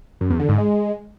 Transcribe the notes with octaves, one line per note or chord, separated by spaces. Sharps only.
F#2
E2
D3
G#2
G#3